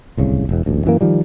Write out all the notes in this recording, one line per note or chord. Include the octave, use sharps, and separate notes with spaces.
D1 C2 C#3
E1 E2
D#1 A1 D2
F#2 E3 A#3
D#3 F3 G3